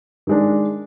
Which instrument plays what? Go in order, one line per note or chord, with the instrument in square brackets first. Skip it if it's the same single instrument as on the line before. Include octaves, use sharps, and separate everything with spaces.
[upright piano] D#3 G#3 D4